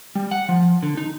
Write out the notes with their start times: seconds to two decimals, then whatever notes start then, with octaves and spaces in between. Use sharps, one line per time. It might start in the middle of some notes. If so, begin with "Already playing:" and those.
0.15 G3
0.31 F#5
0.49 F3
0.83 D3
0.97 D#4